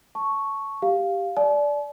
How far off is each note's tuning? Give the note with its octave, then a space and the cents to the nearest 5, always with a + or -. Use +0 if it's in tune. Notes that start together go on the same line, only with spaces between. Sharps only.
A5 +0 C#6 +0
G4 +0 F5 +0
D5 -10 A5 -45